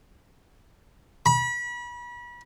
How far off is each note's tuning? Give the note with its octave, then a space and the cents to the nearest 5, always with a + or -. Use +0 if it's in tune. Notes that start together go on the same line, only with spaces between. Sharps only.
B5 -35